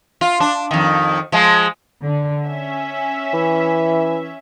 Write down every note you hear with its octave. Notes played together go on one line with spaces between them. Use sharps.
F4
D4
F2 D#3
F3 G#3
D3
C#4 E5
E3